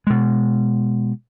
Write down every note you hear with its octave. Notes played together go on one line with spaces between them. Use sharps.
B2 G#3